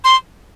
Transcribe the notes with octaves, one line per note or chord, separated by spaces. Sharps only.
C6